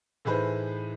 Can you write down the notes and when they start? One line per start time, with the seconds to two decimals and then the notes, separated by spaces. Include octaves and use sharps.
0.25 A2 E3 D#4 G#4 B4 C5